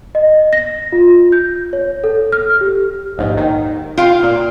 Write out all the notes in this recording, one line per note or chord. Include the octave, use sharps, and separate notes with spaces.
D#5
A#6
F4
G6
C#5
A4
F6
G4
A#1 D#2 G#2
D#3
F4 F5 G5
A#2